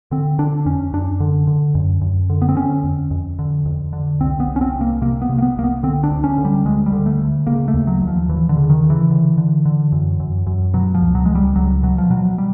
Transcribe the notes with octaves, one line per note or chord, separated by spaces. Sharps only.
D3 C4
D3 D4
F2 C#4
F#2 D4
D3
D3
F#2
F#2
D3
B3
C4
D3 C#4
F2
F2
D3
F2
D3
C2 C4
B3
C2
C#4
C4
C2
A#3
C3 A#3
B3
C3
A#3
B3
C2 A#3
B3
D3 C4
D4
D2
C#4
D3
G3
D2 G#3
G3
D3
A3
D2
C#3 A#3
A3
D#2
F#3
D#2
F3
D#2 E3
D3
C#3
D#3
C#3
E3
D3
D3
D3
F#2
F#2
F#2
B2 F#3
F3
C#2
F#3
C#2 G#3
G3
C#2 F#3
B2 F#3
F3
B2 F#3
G3